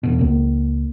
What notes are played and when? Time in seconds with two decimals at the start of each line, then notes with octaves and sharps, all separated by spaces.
0.03 E2 B2
0.19 C#2 A#3